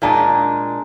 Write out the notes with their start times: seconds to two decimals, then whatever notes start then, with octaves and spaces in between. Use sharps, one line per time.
0.02 A#2 G#3 D4 A#5